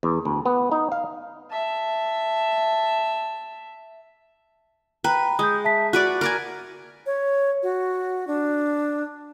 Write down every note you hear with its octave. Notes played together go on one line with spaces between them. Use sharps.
E2
D2
B3
D#4
F5
E5 A5
B4 G5 A#5
G#3 D#6 G6
E5 A5 B6
F#4 B4 D5 F#6
A#4 D5 G#5
C#5
F#4
D4